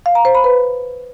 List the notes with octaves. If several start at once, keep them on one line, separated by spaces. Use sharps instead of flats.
F5
A#5
C5
B5
B4